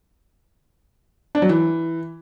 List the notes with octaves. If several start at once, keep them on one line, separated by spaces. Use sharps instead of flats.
D4
F#3
E3